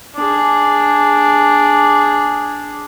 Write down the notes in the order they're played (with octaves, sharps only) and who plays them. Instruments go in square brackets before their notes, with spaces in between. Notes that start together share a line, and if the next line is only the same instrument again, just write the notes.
[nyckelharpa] D4 G#4